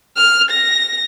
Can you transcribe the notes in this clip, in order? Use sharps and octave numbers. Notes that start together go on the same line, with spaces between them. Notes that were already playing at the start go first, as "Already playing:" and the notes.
F6
A#6